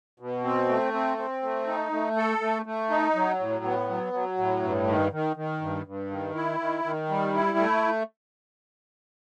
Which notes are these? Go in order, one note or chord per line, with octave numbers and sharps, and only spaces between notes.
B2
C4
A3
C4
C4
A3
D#4
A3
A4
A3
A3
D#4
F#3
A2
B3
F#3
F#3
A2
G2
D#3
D#3
D#3
G2
G2
D#3
E4
D#3
D#3
G3
E4
A3